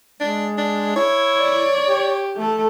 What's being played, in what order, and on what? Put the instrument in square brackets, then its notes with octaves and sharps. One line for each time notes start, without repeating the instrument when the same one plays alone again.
[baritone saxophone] G#3 [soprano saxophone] D4
[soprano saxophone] D4
[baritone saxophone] E4 [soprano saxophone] C#5
[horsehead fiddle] D5
[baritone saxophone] G4
[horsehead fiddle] A3 A4